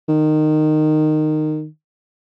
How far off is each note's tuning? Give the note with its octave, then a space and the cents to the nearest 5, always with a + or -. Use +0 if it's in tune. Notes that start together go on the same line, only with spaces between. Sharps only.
D#3 -15